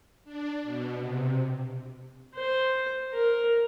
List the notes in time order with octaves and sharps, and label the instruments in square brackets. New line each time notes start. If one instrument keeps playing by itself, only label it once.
[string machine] D4
B2
C3
[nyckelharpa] C5
A#4